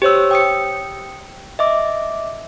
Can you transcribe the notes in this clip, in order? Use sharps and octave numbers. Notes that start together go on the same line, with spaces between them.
G4 C5 C#5 E6
G5 D#6 C#7
D#5 E5 D6